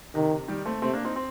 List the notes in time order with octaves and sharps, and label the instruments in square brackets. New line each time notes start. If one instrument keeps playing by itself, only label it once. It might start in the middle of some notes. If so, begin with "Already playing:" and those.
[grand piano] C3 [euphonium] D#3
[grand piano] C3
D#3 G3
A3 C4
[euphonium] C3 [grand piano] A3 C4
[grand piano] A#3 D4
C4 D#4
C4